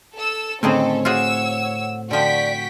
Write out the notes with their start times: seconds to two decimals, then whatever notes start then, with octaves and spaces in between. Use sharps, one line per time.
0.17 A4 E6
0.63 A2 D3 D#3 C4 C#4 G#4 A4 G5
1.05 F4 F#4 G#4 C#5 F#5 E6
2.11 D3 F3 F#4 D5 G5 B6